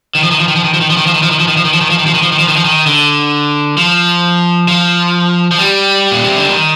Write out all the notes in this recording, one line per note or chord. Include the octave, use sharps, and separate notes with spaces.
D#3
F3
D#3
F3
D#3
F3
D#3
F3
D#3
F3
D#3
F3
D#3
F3
D#3
F3
D#3
F3
D#3
F3
D#3
F3
D#3
F3
D#3
F3
D#3
F3
D#3
F3
D#3
D3
F3
F3
F3
G3
A#2
C3
D3
D#3